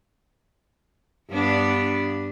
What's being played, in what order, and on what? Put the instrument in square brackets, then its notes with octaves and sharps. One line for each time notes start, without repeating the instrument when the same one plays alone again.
[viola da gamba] G2 B3 D4